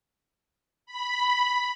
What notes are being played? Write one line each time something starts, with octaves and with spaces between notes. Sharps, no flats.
B5